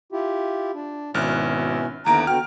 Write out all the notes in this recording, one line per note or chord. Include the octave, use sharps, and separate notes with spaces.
E4 F4 G4
D4
G#1 B2 C#4 E4 F6 F#6
D#2 D3 B3 E4 A#5 D7
D3 B3 F#4 G5 F6